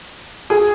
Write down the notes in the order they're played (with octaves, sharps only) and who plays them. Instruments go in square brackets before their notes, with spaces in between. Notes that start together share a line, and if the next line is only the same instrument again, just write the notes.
[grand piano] G#4